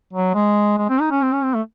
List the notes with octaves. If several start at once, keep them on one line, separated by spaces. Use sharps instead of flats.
F#3
G#3
G#3
C4
D#4
C#4
C4
C#4
C4
A3